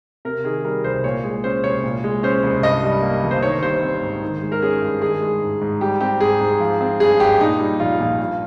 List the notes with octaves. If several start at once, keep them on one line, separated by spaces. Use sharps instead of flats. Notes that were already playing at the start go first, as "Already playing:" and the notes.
C3 A#4
D#3 G#4
G3 A#4
C2 C5
A#2 C#5
G#3
C#4 C5
C2 C#5
A#2
G#3
C#4 C5
C2
G2 D#5
G3
A#3
G1
C5
D#3 C#5
G3 C5
C4
G#2
D#3
G#3
A#4
C#4 G#4
G2
D#3 G#4
G#3
G#2
G#2
G3 G4
C4 G4
G#2 G#4
G#2
F3
C4
G2 G#4
G2 G4
A#2 D#4
G3
A#1 F4
A#1
G2